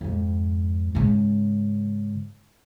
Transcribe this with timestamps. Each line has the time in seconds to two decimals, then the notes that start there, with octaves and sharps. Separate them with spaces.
0.01 F2 G#2
0.95 G#2 C#3